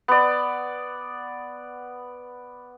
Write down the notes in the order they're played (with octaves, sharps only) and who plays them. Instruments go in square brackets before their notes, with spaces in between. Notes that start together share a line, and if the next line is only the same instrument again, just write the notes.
[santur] B3 D5